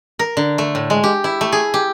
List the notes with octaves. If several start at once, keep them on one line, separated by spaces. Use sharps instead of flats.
A#4
D3
A3
A2
G#3
G4
E4
A3
G#4
G4